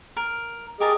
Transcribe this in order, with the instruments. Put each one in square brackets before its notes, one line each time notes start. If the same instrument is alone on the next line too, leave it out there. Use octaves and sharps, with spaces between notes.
[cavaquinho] A#4
[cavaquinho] G4 A#4 A5 [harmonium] G#4 D#5